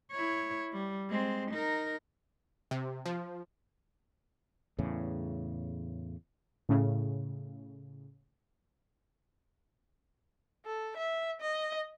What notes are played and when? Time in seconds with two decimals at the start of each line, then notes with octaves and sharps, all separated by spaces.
0.12 E4 C#5
0.73 G3
1.10 G#3 C4
1.51 D#4 A#4
2.71 C3
3.06 F3
4.78 E2 A2 C#3
6.69 A2 C#3
10.65 A4
10.97 E5
11.41 D#5